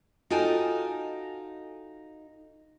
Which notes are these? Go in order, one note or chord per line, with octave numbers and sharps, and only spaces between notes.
D#4 F4 F#4 A4 G5 G#5